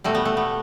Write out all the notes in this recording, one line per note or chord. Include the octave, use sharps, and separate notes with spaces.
B2 G3 A3
B3
A3
B3